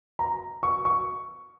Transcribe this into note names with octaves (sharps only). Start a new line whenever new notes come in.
A#5
C#6
C#6